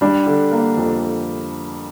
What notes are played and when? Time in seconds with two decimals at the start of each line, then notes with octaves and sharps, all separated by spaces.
0.01 G3 D4
0.26 D3
0.51 A#3
0.77 F2